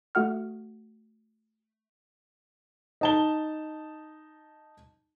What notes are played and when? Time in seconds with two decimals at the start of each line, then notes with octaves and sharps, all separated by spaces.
0.15 A3 F#4 F#5 F6
3.01 D#4 A5 G7